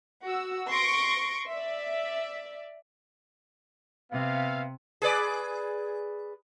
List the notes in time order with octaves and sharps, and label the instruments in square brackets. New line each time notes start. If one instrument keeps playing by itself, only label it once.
[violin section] F#4 E6
C6 C#6 A#6 D7
D5 E5
[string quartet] C3 [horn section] B3 E5 F5
[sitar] G#4 B4 D5